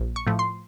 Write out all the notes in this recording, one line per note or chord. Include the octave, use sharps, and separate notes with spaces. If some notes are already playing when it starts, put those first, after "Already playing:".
Already playing: A#1
C#6
A2 F3 A3
C6